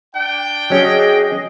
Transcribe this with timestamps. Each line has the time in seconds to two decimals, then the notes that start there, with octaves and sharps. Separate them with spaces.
0.15 D4 G5
0.70 F#3 C#4 G#4 D#5